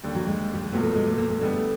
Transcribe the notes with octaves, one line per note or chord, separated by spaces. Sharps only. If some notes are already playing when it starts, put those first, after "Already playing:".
D#2 D3 G3
F#3
G#3
G3
G#3
B1 A#2 F#3 A3 B3
A3
G#3
A3
A#3
A3
D3 G3 G#3 B3
A3